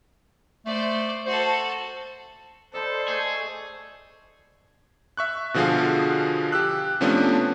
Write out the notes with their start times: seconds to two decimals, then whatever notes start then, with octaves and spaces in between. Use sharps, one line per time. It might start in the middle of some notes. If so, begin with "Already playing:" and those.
0.66 A3 C5 D5
1.26 F#4 A4 C5
2.73 A4 C5 D5 D#5 B5
3.08 A3 G#4
5.17 E5 C#6 F#6
5.54 B2 D3 F3 F#4 G#4 F5
6.52 G4 E6 F#6
7.01 C3 F3 A3 B3 C#4 D4